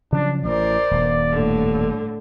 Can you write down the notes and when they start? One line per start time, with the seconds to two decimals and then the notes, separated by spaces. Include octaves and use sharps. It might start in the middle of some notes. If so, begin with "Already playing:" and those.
0.12 C#3 F3 F#3 D4
0.45 A1 A#4 C5 D5
0.91 D#1 G2
1.32 A2 D3